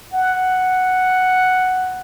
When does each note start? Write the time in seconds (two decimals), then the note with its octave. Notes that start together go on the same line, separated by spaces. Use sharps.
0.14 F#5